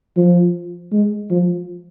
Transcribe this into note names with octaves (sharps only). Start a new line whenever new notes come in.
F3
G#3
F3